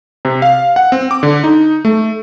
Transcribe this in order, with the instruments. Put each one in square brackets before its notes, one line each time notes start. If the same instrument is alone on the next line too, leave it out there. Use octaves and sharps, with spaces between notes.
[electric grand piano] C3
F5
F#5
C4
D6
D3
D#4
A3